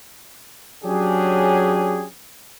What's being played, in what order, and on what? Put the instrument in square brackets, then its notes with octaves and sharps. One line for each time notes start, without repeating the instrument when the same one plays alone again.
[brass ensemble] F#3 C#4 D4 G4 G#4